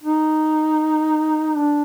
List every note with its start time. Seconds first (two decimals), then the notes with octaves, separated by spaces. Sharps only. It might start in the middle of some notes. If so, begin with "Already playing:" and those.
0.04 D#4
1.56 D4